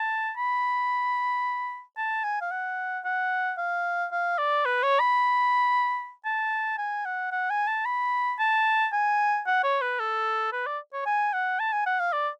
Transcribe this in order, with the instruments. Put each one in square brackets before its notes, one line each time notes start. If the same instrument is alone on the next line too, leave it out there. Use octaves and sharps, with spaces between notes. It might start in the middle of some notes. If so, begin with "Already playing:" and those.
Already playing: [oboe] A5
B5
A5
G#5
F5
F#5
F#5
F5
F5
D5
B4
C#5
B5
A5
G#5
F#5
F#5
G#5
A5
B5
A5
G#5
F#5
C#5
B4
A4
B4
D5
C#5
G#5
F#5
A5
G#5
F#5
F5
D5